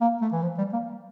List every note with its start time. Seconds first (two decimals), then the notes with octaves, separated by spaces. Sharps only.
0.01 A#3
0.22 A3
0.33 E3
0.42 F3
0.58 G3
0.73 A#3